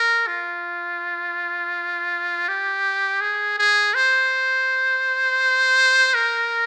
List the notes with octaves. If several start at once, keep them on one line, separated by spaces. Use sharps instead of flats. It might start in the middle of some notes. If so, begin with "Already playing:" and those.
Already playing: A#4
F4
G4
G#4
G#4
C5
A#4